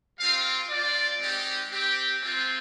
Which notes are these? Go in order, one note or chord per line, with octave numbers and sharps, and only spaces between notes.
G3 C4 F4 F5
C4 F4 D5
G#3 C4 D#4 G4
C4 G4
G#3 C4 F4